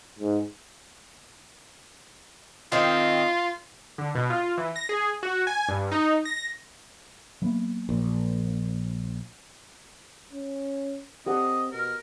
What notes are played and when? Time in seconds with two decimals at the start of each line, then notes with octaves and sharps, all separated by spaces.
0.19 G#2
2.72 D#3 C4 F4
3.98 D3
4.15 B2
4.30 F4
4.58 E3
4.76 A#6
4.89 G#4
5.23 F#4
5.47 G#5
5.69 G2
5.92 D#4
6.25 A#6
7.42 F#3 A#3 B3
7.89 A#1
10.32 C#4
11.26 C4 G4 A4 D#5 F#5
11.72 B2 A#4